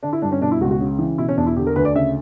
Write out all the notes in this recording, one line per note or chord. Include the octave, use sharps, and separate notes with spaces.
D3 D4
E4
G2 D4
C#4
B2 D4
E4
C#2 F#4
F#4
C#3
E3
B2 E4
C#4
E2 D4
E4
D3 G4
A#4
D2 B4
D5
C#3 E5